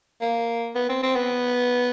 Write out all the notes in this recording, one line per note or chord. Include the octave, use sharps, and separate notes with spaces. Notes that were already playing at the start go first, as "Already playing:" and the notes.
A#3
B3
C4
C4
B3